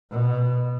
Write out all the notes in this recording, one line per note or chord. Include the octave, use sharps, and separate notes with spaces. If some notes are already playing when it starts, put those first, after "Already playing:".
B2